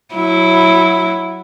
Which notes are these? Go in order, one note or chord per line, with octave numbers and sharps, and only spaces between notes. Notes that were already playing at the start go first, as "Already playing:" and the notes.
F#3 E4